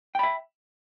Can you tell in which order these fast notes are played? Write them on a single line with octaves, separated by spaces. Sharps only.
G5 B5 E5